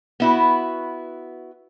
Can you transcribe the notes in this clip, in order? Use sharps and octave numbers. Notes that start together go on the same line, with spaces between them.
B3 E4 F#4